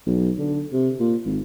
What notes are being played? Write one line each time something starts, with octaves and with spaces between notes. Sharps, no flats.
B1
D3
C3
A#2
G#1